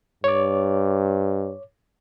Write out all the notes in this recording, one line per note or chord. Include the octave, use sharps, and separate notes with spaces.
G2 C#5 D6